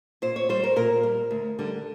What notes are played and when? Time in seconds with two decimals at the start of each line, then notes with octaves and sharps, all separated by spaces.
0.22 A#2 C5
0.36 C#5
0.49 G3 C5
0.64 A#4
0.76 A#2 A#4
1.03 G3
1.31 D2
1.59 D3 G3